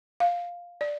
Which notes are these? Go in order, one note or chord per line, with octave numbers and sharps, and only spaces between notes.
F5
D5